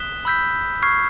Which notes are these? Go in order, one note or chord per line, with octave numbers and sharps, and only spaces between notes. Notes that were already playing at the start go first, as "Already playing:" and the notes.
Already playing: D#6 F#6 B6 E7 G7
B5 E6 G6 B6
C#6 F6 G#6 C7